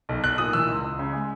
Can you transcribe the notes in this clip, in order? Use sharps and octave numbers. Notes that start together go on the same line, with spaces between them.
B1
B1 F#6
A#2 D#6
E3 E6
C#2
C#2
C#3
G#3